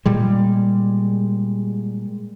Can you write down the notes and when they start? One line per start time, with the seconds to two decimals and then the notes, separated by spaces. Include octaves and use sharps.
0.06 A#2 G3 G#3